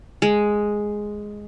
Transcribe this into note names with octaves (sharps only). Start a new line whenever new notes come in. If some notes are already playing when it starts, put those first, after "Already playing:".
G#3